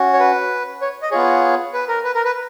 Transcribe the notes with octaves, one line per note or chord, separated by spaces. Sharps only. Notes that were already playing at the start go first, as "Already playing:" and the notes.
Already playing: C#4 F#4
C#5
B4
C#5
D#5
B3 F4 G#4 C#5
B4
A#4
B4
A#4
B4